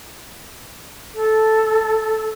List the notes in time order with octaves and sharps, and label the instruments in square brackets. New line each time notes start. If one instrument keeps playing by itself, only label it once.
[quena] A4